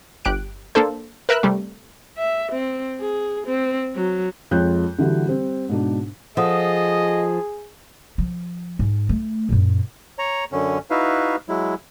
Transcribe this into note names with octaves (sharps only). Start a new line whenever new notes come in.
G1 G4 F#6 D7
A#3 D4 A4 C5
A#4 B4 E5 E6 F#6
C3 G3 A3
E5
C4
G#4
C4
F#3
F2 G#3 F4 C#5 F#6 G6
D3 E3 G3 F#4
G3 C4
G#2 B2 D4
F3 G#4 A4 D#5 F#5 D#6
F3
G#2
A3
F#2 A#2
C#5 A#5
F#2 D3 C#4
D#4 E4 F#4 B4 E5 F5
F#3 G#3 E4